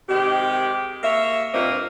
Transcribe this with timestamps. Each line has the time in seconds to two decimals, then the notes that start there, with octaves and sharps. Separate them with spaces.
0.09 C3 D#3 G#3 G4
1.03 A#3 C#5 E5
1.54 G2 A#2 A#3 C4 D#5